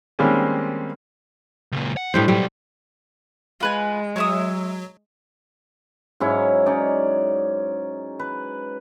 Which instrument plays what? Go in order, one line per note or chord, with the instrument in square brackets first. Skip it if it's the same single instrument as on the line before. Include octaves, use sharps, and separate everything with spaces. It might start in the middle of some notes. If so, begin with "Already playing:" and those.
[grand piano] D#3 G3 G#3 A#3 C4 C#4
[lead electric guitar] C#2 A#2
F#5
[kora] A2 G3 C5 [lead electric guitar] G#3 D4
[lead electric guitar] B2 F#3 [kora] G3
[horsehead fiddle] G#3 [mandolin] F4 B4 G#5
[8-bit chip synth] F#3 [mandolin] C#5 E5 D#6
[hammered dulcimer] G#2 F#3 C#4 E4
C#4 D#4 D5
B4